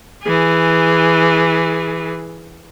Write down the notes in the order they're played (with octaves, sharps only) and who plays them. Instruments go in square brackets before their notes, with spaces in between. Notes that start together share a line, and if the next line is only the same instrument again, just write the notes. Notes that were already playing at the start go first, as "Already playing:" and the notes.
[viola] E3 G#4